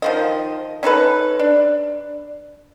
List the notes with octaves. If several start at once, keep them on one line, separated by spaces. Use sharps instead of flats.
D#3 F3 D#5
C#4 D#4 A4 B4
D4